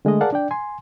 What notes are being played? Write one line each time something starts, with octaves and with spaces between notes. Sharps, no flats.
D3 G#3 A3 D#5
G#4 A#4 D5 F5 F#5 A5
D4 D5 G5
G#5 C6